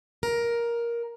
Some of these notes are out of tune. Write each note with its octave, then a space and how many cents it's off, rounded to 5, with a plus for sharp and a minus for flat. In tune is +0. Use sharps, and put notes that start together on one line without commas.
A#4 +10